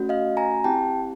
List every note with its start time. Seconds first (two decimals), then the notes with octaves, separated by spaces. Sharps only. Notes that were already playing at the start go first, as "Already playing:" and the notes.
Already playing: A3 C#4 F#4
0.09 D#5 F5
0.37 G#5 A#5
0.64 C4 E4 G4 G5 A5